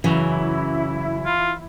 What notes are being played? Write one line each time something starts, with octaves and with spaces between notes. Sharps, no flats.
F#2 C#3 E3 F#3 E4
F4